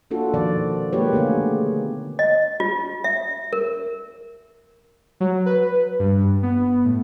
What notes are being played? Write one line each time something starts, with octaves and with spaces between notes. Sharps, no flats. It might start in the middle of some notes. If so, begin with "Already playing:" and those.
A#3 D4 F4 F#4 A4
B2 D#3 F3 D5
G#3 A#3 F4 G4 B4 C#5
D3 A3 B3 G#4
D#5
F4
E5
A#4
F#3
B4
G2
B3
A2